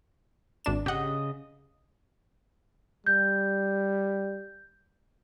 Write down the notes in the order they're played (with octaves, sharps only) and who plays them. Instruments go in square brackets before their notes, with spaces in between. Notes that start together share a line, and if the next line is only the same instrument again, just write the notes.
[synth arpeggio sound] G#1 D4 E7
[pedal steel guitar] C#3 D#5 [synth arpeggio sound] G4 F#5
[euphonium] G3 [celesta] G6